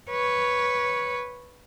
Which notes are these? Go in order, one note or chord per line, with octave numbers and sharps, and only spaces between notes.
B4 C#5